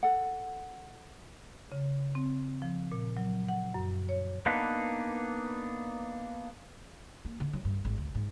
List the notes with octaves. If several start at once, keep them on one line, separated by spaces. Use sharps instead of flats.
A4 F#5
C#3
C4
F3
A#2
F#3
F#5
F#2
C#5
A#3 B3 D4 D#4 B4
A#3
D3
F#3
G2
G#1
D2
G#2